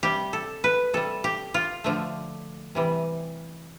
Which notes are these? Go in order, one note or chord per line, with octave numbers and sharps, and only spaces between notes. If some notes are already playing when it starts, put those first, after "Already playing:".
C3 G3 G4
A4
B4
C3 G3 A4
G4
F4
D3 F3 A3
C3 E3 G3